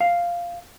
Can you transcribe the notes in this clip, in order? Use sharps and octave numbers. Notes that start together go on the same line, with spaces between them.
F5